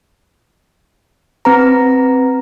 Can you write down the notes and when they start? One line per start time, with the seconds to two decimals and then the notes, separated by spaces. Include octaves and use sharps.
1.45 C4 B4 A#5